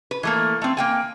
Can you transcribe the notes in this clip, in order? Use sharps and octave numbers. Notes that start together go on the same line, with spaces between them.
B4
E3 A3 A#3
A3 C4
A#3 G5 G#5